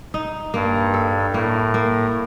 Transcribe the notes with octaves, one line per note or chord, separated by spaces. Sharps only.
D#4
G2 A#3
A4
A2 A#3
A#3